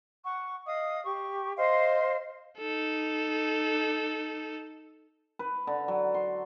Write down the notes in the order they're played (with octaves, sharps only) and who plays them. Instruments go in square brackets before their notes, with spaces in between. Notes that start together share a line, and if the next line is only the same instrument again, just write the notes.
[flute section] F#5 C#6
D#5 F5 D#6
G4 C#6
C5 D#5 F5 C6
[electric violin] D#4 A4
[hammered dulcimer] B4
D3
F#3
C6